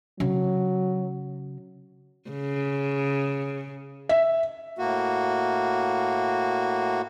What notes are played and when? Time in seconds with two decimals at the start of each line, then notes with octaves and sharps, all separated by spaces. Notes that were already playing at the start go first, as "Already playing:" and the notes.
0.20 C#3 F#3
2.30 C#3
4.09 E5
4.79 A2 A#3 F#4